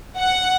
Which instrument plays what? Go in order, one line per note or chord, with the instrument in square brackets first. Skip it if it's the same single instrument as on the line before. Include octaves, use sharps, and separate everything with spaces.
[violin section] F#5